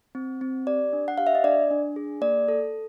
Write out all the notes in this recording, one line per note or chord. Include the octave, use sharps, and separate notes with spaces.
C4
C4
G4 D5
D4
F#5
G4 F5
E5
D#5
D4 D5
D4
G#4
A#3 D5
A4